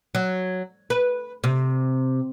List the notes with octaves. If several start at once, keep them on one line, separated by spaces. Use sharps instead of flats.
F#3
B4
C3